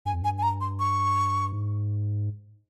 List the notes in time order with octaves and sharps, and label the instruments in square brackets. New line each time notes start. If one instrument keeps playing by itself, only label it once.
[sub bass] G2 [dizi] G#5
[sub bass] F2
[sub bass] G2 [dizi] G#5
[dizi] G#5
A#5
C6
C#6
[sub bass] G#2